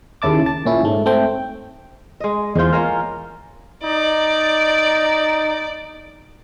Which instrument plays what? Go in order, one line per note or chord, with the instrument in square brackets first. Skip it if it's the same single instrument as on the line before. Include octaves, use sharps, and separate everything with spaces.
[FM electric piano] D#2 C#3 E4 A5 D6
A5
A#2 C#4 E4
G#2 A3
A3 C4 G5
[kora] G#3 D#5
[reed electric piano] E2 C5 G6 [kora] G#3 F4
[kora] A#3 C#4 F4 [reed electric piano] G#5 A#5 F6
[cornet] D#4 [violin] D5